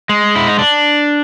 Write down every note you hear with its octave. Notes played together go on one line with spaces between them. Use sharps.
G#3
E4
D#4
D4